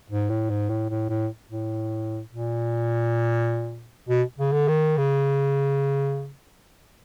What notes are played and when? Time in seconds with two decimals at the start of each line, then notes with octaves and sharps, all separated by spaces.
0.10 G#2
0.30 A2
0.50 G#2
0.70 A2
0.90 A2
1.09 A2
1.50 A2
2.29 A#2
4.09 B2
4.39 C#3
4.53 D3
4.68 D#3
4.97 C#3